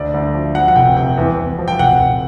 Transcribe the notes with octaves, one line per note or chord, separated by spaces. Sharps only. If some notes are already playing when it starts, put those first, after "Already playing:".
Already playing: D2 D5
D2
F3
F3 F#5
F#5
F1 G5
C3 G5
E2
E2
F3
G5
F1 F#5
F1